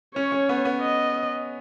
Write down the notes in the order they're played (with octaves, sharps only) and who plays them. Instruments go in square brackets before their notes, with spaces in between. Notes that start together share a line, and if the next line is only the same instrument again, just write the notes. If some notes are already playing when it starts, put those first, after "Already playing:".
[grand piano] C#4 [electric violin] C#5
[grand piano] C#4
B3
B3
[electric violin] D#5